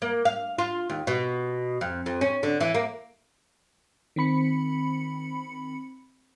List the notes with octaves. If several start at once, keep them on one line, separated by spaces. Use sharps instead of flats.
A#3
F5
F4
D#2
B2
F2
F2
C#4
D3
E3
A#3
D#3 C4 B5 C#7